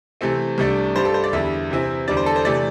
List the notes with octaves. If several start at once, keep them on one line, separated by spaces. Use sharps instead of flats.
C3 E3 A3 C4
C2 C3 A3 D4
G2 G3 D4 C5
A4
C5
D5
E2 D3 G3 E5
C3 E3 C4 E4
E2 D3 G3 D4 D5
C5
A4
C5
C3 E3 A3 D5